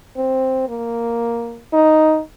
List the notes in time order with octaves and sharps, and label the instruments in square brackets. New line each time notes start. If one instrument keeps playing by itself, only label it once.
[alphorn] C4
A#3
D#4